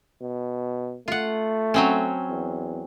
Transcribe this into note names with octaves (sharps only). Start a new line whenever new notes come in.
B2
A3 F4 F#5
F#3 C4 C#4
E2